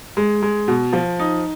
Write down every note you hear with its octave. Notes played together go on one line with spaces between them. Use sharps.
G#3
G#3
B2
F3
D#4